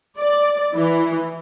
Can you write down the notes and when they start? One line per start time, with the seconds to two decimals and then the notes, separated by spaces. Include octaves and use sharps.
0.19 D5
0.74 E3